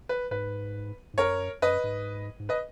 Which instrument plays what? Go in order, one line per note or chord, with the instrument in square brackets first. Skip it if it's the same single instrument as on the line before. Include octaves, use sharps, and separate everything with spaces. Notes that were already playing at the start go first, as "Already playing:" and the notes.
[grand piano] B4
[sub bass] G#2 [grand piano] B4
[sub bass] G#2
[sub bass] F#2 [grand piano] A#4 C#5
[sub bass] F#2 [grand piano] B4 D#5
[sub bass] G#2
G#2
[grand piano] B4 D#5